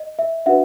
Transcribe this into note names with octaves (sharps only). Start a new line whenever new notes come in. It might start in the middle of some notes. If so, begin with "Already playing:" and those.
Already playing: D#5
E5
D4 F#4 B4 E5 F#5